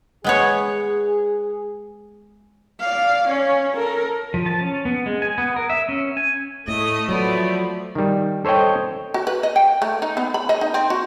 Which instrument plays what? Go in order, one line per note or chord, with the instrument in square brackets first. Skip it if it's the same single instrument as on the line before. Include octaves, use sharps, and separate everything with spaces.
[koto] G#3 B3 C#5 [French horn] G#4
[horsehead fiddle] D5 F5
C#4 C#5
A4 A#4
[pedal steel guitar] F3
A5
C#4
B3
G#3
G#5
B3
A#4
E5
C#4
G#5
[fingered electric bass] A2 [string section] A3 [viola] D#5
[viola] F3 [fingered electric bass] F#3 [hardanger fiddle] B3 D5
[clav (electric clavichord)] D#3 G3
A4 C5 C#5 D#5 G5
[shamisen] F#4
B4
D#5
G5
A3
D#4
B3
B5
D#5
D#4
C4
F#4